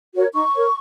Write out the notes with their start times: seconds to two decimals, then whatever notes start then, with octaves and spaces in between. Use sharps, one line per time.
0.13 F#4 A#4 C#5
0.33 D#4 C#6
0.52 A#4 C#5